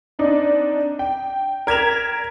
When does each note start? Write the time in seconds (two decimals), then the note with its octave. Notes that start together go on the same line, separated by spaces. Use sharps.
0.19 C4 D4 D#4
0.99 G5
1.67 A#4 G#6 B6 E7 F7